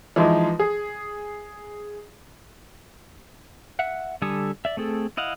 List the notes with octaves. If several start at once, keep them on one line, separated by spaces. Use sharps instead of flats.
E3 F3 G#3 D#4
G#4
E5 F#5
D3 G3 A4 G#5 D#6
D5 E5
A3 C4 G#4 A4
E4 D#5 F5 F#5